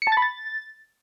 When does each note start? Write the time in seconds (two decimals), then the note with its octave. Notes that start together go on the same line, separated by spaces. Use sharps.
0.02 C#7
0.07 A5
0.12 A6
0.17 B5
0.22 A6